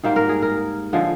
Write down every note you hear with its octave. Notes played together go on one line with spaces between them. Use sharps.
G#2 G3 A#3 C5
A#4
G#4
A#4
D3 F3 G#3